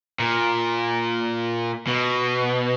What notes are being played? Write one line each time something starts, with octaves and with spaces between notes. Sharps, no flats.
A#2
B2